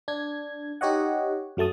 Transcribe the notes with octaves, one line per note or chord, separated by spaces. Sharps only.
D4 G#6
D#4 G4 C#5 D#5 F#5
F#2 F#3 A3 A5 D#6